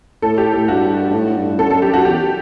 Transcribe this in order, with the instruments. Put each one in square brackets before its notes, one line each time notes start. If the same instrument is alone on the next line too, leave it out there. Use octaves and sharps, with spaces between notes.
[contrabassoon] A2 [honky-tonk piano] A4
[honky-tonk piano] G4
[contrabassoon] A2 [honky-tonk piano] A4
[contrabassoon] G2 [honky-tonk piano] F#4
[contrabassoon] G2
A2
G2
[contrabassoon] F#2 [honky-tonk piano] A4
[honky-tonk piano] A4
G4
F#4
[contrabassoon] E2 [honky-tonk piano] G4